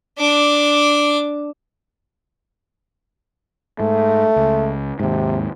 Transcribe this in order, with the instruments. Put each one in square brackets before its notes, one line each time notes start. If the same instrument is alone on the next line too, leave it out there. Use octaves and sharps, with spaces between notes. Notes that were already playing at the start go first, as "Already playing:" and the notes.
[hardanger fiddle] D4 D6
[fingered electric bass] G#2 [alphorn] A3
[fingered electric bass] C#2
[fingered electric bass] D#2 G#2 [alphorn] C3